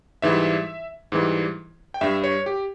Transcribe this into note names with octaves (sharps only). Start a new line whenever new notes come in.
G#2 E3 G3 E5
G#2 E3 G3
G5
G2 G3 E5
C#5
G4